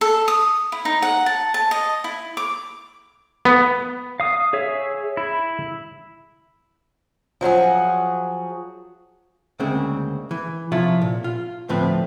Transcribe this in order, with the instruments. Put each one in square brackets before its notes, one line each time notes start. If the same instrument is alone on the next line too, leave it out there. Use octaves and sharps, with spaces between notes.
[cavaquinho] A4
D#6
E4
D#4
F#5
A5
A5
D#5
E4
D6
[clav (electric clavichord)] B3
[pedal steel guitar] F5 D#6
G#4 C#5 E5
E4
[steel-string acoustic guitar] F3 F#3 F#4 G#4
[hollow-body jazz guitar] D2 C#3 G#3 A#3 C4
E3
C3 F3 E4 F4 C#5
A#2
F4
D2 A2 F3 C4 B4